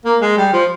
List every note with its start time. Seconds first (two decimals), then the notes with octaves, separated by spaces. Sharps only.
0.05 A#3
0.22 G#3
0.38 G3
0.53 F3